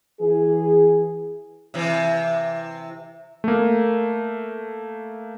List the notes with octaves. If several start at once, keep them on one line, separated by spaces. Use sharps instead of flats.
E3 G#4
C3 E3
A3 A#3